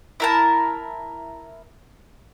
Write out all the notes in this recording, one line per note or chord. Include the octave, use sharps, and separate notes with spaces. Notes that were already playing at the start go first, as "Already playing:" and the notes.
E4 A#4 A5